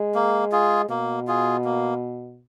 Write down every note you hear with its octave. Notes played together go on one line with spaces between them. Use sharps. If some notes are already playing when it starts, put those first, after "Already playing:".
Already playing: G#3
A#3
F4 G#4
B2 A#3
F4 G#4
A#3